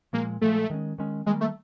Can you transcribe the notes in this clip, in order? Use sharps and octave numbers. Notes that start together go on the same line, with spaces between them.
A#2 F3 G#3 A#3
A#2 F3 G#3 A3
D#3 G#3 C#4
D#3 G#3 C#4
D#3 G3 G#3 A#3
A3